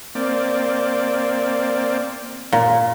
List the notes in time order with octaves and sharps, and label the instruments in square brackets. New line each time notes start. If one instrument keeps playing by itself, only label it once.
[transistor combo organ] A#3 C4 D5
[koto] A#2